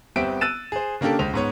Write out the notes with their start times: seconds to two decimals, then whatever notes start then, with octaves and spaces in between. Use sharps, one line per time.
0.16 G1 B3 C4 G4 E5 D7
0.41 E6 F#6 A6 D#7 E7
0.72 G#4 C5
1.01 C#3 A#3 D4 G4 A4
1.19 C#2 C5 F7
1.33 G#2 B3 C#5